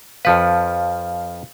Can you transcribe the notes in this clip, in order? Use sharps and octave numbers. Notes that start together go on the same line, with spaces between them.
F2 F3 B4 F5 F6